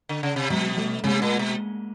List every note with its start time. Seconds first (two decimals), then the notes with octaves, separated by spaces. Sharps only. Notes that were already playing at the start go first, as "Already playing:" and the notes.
0.09 D3
0.23 C#3
0.36 C3
0.50 B2 F#3 G#3
0.77 G3 A3
1.04 C3 G#3 A#3
1.22 A#2
1.39 B2